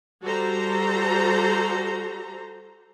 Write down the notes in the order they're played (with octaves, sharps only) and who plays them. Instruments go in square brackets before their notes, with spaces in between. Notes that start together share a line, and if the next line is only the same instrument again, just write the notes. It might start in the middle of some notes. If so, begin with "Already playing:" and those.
[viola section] G3 F#4 A4 C5 A#5